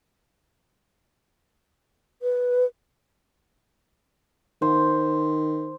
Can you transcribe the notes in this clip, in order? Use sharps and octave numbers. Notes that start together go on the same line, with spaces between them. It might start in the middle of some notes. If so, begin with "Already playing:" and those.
B4
D#3 C5